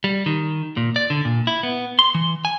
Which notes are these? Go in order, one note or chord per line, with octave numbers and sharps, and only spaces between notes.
G3
D#3
A#2
D5
D3
A#2
E4
B3
C6
E3
G#5